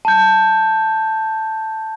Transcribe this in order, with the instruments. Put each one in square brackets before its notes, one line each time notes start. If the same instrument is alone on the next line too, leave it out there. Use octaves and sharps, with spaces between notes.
[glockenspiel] A5 G6